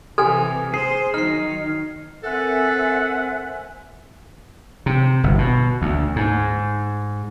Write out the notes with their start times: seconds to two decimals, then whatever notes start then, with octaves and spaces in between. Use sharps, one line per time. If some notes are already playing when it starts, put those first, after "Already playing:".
0.18 C3 E3 A4 G#5 F6 G#6
0.74 G#4 C5 C7
1.14 D#3 F#3 D#4 F6 C7
2.23 C4 A4 A#4 C5 E5 F#5 G#5
4.86 C3
5.24 G1
5.38 B2
5.82 D2
6.16 G#2